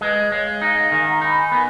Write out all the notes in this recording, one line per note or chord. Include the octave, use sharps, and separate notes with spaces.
G#3 B4 D#5
G#3 C#5 F5
D#4 F5 G#5
D#5 F#5
D#3 F5 G#5
F#5 A#5
D#4 G#5 B5
B3